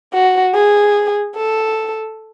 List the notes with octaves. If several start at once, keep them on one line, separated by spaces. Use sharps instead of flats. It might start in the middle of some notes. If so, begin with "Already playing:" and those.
F#4
G#4
A4